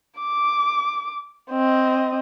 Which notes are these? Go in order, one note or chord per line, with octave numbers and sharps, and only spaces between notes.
D6
C4 D#5